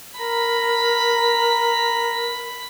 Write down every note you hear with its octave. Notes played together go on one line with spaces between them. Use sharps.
A#4 A#5 B5